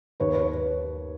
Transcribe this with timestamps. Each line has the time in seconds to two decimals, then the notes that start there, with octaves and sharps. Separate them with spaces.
0.20 D#2 B4 C#5
0.33 B4 C#5